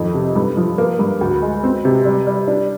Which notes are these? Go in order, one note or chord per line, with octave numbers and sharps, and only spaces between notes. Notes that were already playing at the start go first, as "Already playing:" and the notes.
Already playing: F2 D#3
C3
G2
F3
A#3
G2
D2
G#3
C4
C3
G3
G3
D4